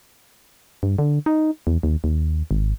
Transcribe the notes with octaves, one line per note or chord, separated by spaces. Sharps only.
G2
D3
D#4
E2
D#2
D#2
G#1